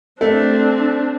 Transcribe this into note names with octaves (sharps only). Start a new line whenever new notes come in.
A3 C4 D4